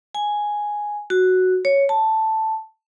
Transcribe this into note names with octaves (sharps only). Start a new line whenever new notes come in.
G#5
F#4
C#5
A5